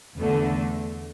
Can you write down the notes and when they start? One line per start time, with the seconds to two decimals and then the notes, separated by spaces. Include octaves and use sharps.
0.16 E2 D3 A3